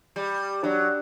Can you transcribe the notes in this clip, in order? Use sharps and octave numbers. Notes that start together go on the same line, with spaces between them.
G3
F#3 D4